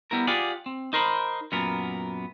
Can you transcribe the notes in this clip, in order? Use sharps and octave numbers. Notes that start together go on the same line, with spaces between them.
G3 B3 E4 A#4
F4 G4 G#4 D5 F#5
C4
D#4 A#4 C5 B5
F#2 A#2 B3 A#4